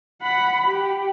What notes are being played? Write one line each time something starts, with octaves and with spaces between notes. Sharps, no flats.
F#5 B5
G4